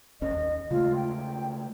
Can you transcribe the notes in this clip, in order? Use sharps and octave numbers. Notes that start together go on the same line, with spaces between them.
G#1 D#2 C#4 D#5
D#2
C#3 G#3 A3 F4
G5